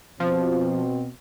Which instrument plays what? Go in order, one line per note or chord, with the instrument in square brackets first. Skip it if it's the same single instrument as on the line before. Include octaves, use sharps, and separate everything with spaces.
[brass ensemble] B2 C4 [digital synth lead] F3